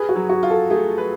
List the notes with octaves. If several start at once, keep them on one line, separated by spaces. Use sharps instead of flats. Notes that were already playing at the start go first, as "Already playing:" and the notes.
Already playing: G#4 B4
F#4
F#3
F#4
F4
A4
A3 G#4
B4